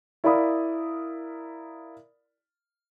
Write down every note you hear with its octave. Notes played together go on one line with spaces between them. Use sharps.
E4 A#4 D5 F5 B5 D#6